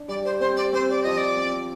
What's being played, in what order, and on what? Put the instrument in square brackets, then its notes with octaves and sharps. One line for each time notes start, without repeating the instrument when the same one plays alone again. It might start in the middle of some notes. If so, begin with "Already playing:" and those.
Already playing: [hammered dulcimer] D4
[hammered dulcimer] G3 [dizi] D5
[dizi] C5
[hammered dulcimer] C4 [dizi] C5
[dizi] D5
[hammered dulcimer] C4 [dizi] C5
[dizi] D5
[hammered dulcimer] F3 [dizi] D#5
[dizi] D5
[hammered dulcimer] C4